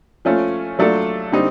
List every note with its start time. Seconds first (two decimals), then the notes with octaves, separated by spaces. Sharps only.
0.25 F3 A3 C#4 F4
0.79 F#3 A3 D4 F4 A4
1.32 D3 G3 C4 D#4